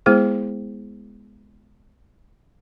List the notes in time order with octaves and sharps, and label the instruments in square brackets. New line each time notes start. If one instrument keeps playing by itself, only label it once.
[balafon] G#3 B3 E4 G#4 C5